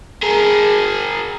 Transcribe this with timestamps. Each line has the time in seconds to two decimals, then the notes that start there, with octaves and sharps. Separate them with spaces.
0.22 G#4 A#4